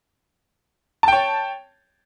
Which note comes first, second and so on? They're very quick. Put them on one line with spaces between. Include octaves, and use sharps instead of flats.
A5 G5 C#5